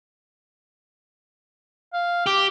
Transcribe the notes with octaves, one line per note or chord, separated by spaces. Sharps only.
F5
G4 D6